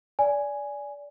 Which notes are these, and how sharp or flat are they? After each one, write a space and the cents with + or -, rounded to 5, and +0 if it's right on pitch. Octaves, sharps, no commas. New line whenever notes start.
D5 -20 G#5 +0